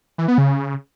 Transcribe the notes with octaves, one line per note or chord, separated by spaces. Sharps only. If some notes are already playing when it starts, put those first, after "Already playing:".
E3
B3
C#3